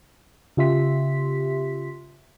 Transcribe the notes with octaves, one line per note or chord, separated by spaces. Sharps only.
C#3 F4 G4 E5 C6 B6